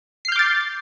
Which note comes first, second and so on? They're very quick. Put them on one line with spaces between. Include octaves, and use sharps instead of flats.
C7 F6 G6 D6 A6